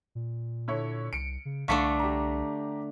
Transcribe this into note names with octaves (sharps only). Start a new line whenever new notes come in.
A#2
D3 E4 C#5
C2 C#7 D7
C#3
C2 D3 A3 D4 F5 C#6 B6
G4 A#5